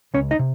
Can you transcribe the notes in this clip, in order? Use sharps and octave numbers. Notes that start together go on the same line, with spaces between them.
C#2 C#4 C#5
D#4 D#5
C3